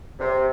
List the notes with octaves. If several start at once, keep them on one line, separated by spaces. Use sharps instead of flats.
C3